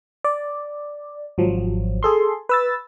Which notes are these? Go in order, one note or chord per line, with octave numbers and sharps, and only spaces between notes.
D5
G#1 F3 F#3
G#4 A4 C6
B4 E6 A6